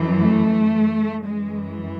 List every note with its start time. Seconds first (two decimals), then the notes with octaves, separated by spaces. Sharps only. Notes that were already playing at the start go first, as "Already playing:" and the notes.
Already playing: F#2 E3
0.20 A3
1.25 F#2 E3 G#3